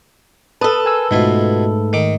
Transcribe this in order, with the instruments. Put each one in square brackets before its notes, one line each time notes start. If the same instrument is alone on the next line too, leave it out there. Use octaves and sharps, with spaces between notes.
[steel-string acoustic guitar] A4 B4 [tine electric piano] A5 D#6
[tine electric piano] A#4 G#5 E6
[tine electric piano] G#2 A3 [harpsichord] B2 E4 F4
[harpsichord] D#3 D6